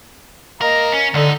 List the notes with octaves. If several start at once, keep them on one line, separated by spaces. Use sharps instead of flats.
G#2 A#3 A#4 D#5 A#5
C#4
C#2 D3 D#4